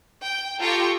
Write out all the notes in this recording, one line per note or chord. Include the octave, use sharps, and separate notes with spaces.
G5
F4 G4 A4 G5 A#5 C#6